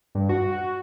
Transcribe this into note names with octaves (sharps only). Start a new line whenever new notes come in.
G2
F#4
F#4